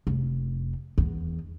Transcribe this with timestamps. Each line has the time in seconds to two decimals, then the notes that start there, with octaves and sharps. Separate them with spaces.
0.07 F1
0.98 E2